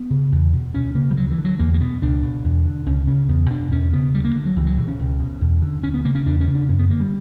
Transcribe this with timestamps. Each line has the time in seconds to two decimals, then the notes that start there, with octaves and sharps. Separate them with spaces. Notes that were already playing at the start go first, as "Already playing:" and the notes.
Already playing: B3
0.10 C#3
0.32 E2
0.53 B2
0.74 D2 C#4
0.95 C#3 A#3
1.11 G3
1.16 D2 F#3
1.31 E3
1.38 D3
1.45 F#3
1.59 E2 A#3
1.74 A#3
1.80 B2 B3
2.02 C#2 D4
2.23 B2
2.44 E2
2.65 D3
2.86 C#2 C#4
3.07 C#3 C#4
3.29 E2 B3
3.50 B2 D4
3.71 E2 C#4
3.92 C#3 B3
4.13 D2 G3
4.24 A#3
4.36 D3
4.45 F#3
4.56 C#2 E3
4.66 F#3
4.78 B2 E3
4.88 C#4
4.99 C#2
5.20 B2
5.41 E2
5.62 D3
5.83 D2 C#4
5.94 B3
6.05 C#3 A#3
6.15 C#4
6.26 E2 D4
6.40 C#4
6.48 C#3
6.55 D4
6.69 F#2 C#4
6.79 B3
6.90 D3 A#3
7.00 G3